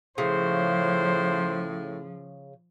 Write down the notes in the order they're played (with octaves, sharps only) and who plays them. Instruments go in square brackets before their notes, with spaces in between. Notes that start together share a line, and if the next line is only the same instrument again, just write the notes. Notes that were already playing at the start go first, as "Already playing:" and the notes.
[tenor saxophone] A2 [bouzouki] C#3 [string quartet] F3 [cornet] C5